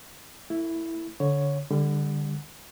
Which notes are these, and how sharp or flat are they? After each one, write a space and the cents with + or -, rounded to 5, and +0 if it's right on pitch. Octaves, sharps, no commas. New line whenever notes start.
A3 +40 E4 +0
D3 -20 C#5 +0
D3 +10 G3 +40